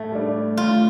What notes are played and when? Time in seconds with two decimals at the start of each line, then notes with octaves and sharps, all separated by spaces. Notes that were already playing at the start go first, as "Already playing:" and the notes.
Already playing: A2 A3
0.12 G3 D4
0.57 A2 F4